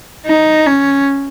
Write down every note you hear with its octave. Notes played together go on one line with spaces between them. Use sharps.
D#4
C#4